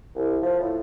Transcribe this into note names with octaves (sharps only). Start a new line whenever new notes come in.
C2
F3
A2